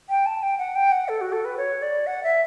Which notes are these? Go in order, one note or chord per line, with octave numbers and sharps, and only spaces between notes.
G5
A5
G5
F#5
G5
F#5
A4
F#4
A4
B4
C#5
D5
F#5
E5